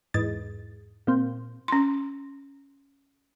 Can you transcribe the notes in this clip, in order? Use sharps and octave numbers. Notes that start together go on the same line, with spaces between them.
E2 G#2 A6
A#2 C4
C#4 C6